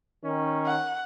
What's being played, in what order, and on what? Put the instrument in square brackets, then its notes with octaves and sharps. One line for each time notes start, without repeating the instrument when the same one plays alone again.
[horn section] D#3 C#4
[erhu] F#5